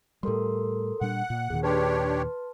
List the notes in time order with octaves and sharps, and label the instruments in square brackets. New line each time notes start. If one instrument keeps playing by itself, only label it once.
[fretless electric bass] A2 G3 [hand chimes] A4 A#4 C6
[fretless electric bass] A#2 G3 D4 [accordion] F#5
[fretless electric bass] A#2
[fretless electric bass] D#2 A#2 D#3 [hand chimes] G#4
[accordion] D4 G4 C#5 [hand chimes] B4 A5 C6